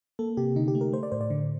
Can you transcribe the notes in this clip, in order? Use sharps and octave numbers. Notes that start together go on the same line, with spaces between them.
A#3 A4
C3 G4
D3 D#4
G4
A3
A#4
A3 C5
D5
A2 C5
D5
D3